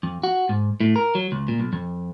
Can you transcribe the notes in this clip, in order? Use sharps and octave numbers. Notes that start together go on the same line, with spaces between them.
F2
F#4
G#2
A2
A#4
F#3
C#2
A#2
B1
F2